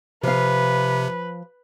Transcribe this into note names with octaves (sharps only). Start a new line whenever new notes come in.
C3 F3 B4 F5